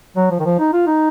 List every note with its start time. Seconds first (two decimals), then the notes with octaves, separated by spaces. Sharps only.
0.16 F#3
0.31 F3
0.39 D#3
0.45 F3
0.59 D#4
0.73 F4
0.87 D#4